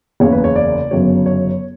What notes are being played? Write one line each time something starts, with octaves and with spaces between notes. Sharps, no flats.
F#1 E2 C#3 C#5
B4
C#5
D5
G1 F#2 C#3 F#3 C#5
C#5